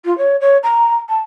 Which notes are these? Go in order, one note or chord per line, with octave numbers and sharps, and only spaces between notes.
F4
C#5
C#5
A#5
A5